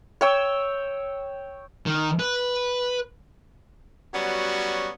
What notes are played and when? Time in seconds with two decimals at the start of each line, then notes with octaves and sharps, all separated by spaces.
0.21 C#5 G5 E6
1.86 D#3
2.19 B4
4.14 F#3 G3 B3 C#4 F#4